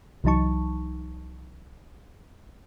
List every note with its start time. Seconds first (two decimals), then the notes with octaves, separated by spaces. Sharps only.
0.24 C2 E3 F#3 D#4 A5 C#6